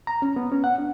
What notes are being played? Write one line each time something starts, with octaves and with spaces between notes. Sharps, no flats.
A#5
C#4
B3
C#4
F#5
D4